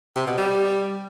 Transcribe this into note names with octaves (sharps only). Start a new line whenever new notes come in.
C3
B2
G3